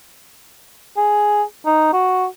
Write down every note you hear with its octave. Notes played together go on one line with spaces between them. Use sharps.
G#4
D#4
F#4